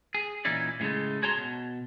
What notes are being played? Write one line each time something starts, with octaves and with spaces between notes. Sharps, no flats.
G#4
A#2 E3 C#4 D#4 E4 D5
A2 C#3 F3 G#3 A3
F#4 G#4 C#5 A5 A#5 C6
B2